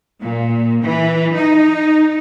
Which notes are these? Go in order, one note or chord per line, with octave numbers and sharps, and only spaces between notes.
A#2
E3
D#4